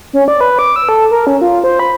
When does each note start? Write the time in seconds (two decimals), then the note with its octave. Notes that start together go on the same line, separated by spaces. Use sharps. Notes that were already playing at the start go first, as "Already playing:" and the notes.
0.13 C#4
0.28 D5
0.41 B4
0.59 D6
0.76 E6
0.89 A4
1.11 A#4
1.27 C#4
1.41 F4
1.64 C5
1.79 B5